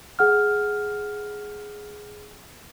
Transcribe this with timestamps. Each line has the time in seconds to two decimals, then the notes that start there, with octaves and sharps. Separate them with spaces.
0.19 G#4 F#5 F6